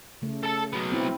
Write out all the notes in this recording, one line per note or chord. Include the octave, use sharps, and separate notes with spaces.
C#3 A3
A4 A5
F#3 B3
C4 E4